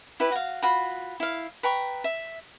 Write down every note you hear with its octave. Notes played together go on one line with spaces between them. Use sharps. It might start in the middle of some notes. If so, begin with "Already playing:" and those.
E4 G4 B4
F#4 F5
F4 F#4 B5
E4 F5
B4 G5 A#5 C#6
E5